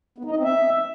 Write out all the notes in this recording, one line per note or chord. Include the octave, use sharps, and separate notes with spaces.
B3
D#4
D#5
C4
E5